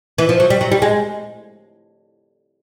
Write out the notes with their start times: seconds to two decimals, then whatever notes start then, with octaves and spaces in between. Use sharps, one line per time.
0.18 E3
0.29 F3
0.40 F#3
0.50 G3
0.61 F#3
0.72 G3
0.82 G#3